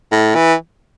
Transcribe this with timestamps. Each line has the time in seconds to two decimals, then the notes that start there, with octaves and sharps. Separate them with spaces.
0.12 A2
0.35 E3